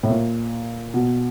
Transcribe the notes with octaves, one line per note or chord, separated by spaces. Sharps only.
A2
A#2
B2